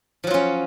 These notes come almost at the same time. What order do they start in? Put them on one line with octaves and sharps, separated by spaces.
F3 F#3 F4 C#4